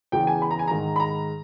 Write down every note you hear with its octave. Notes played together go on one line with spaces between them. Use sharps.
E2 C#3 E3 G5
G#5
B5
A#5
G#5
G#2 D#3 A#5
B5
A#5